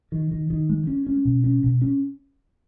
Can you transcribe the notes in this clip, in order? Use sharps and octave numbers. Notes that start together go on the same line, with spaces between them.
D#3
D#3
D#3
G#3
C#4
C#4
B2
C#4
B2
C#4